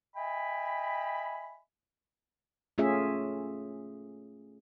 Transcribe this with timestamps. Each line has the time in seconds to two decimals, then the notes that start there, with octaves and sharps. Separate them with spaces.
0.16 D#5 E5 G5 G#5 B5
2.78 A3 C#4 F4 G#4 E5